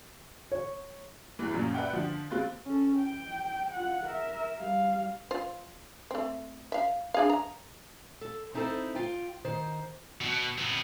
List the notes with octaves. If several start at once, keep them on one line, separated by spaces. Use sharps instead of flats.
C#5
E2 E3
F#2 A#2 F3 F#3 A#3 C#4
B4 D5 E5 F#5 G5
D3 F3
D#2 G#3 C4 F4 F#6 A6
C#4 A4
G5
F4 F#5
A#4 E5
G3 F5
F4 C5
A3 C4
E5 F5
D4 G#4 F5
A#5
A4
C4 D#4 E4 F#4 A4 C5
F4 G5
D#3 C5
B2
C3 B3